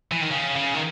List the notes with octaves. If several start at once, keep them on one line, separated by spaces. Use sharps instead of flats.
E3
D#3
C#3
C#3
D#3